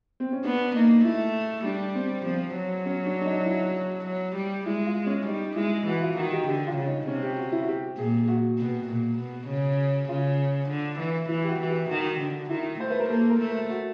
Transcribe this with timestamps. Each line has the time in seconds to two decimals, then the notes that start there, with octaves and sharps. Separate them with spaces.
0.20 C4
0.32 C#4
0.44 B3 D4
0.75 A#3 D#4
1.04 A3 E4
1.65 G3 D4
1.95 C4
2.25 F3 C4
2.56 F#3
2.86 C#4
3.06 D4
3.21 D4
3.25 D#4
3.46 E4
4.06 F#3
4.36 G3
4.66 G#3 E4
4.86 F4
5.06 C#4
5.27 G3 D#4
5.56 G#3 E4
5.86 E3 F#4
6.02 F4
6.17 D#3 F#4
6.32 G4
6.47 D3 G4
6.67 F4
6.77 C#3
6.87 D#4
7.07 C3 C#4
7.23 G4
7.38 F#4
7.52 E4
7.62 F#4
7.68 G4
7.97 A#2 G#4
8.28 F#4
8.58 B2
8.88 A#2
9.18 B2
9.48 C#3
10.09 C#3 F4
10.69 D3
10.99 E3
11.28 E3 E4
11.44 G4
11.49 F#4
11.59 E3
11.69 G4
11.89 D#3 F#4
12.20 D3
12.49 D#3 E4
12.79 A3 C5
12.90 B4
13.00 A#4
13.09 A#3 A4
13.30 A#4
13.40 A3
13.50 A#4
13.70 F#4